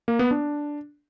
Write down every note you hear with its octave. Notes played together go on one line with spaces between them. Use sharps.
A#3
B3
D4